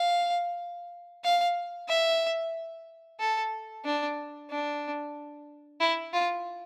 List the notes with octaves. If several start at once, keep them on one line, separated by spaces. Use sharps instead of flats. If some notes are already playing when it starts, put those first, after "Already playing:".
Already playing: F5
F5
E5
A4
D4
D4
E4
F4